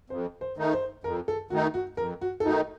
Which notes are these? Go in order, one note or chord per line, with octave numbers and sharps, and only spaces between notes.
F2 C5
C5
D#3 A3 D#4
C5
F2 A#4
A4
D#3 A3 D#4 F#4
F#4
F2 A#4
F#4
A4
D#3 A3 D#4 F#4